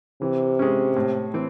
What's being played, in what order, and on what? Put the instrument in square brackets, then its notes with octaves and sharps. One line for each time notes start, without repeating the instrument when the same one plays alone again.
[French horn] C3 [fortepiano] E3
[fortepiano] G#3 C#4
A2
E3 C4